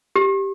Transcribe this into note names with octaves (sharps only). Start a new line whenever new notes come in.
G4